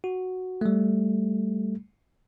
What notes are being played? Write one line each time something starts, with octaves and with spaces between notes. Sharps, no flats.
F#4
G3 A3